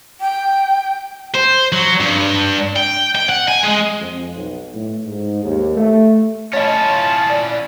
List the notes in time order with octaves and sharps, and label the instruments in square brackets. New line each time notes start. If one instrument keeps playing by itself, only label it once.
[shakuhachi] G5
[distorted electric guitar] C5
F#3
G2
G5
G5
F#5
G#5
G#3
[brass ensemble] F2
B1
A2
G#2
D#2
A3
[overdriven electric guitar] C#4 E4 [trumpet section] F4 A5 [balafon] C#5 D#5
[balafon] D5